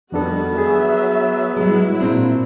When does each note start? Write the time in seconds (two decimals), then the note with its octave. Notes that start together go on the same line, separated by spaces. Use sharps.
0.12 F2 D#3 G3 B3 D4 F#4 A4
0.58 F#3 G#4 E5
1.57 F#3 G#3 E4 F#4
1.99 A#2 C4 D4